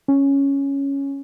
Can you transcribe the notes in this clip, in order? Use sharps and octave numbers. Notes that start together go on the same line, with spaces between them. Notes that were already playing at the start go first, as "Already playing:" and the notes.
C#4